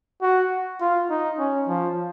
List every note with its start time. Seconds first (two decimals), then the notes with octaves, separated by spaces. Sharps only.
0.22 F#4
0.81 F4
1.10 D#4
1.39 C#4
1.68 F3